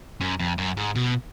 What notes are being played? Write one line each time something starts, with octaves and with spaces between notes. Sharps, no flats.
F#2
F2
F#2
G#2
B2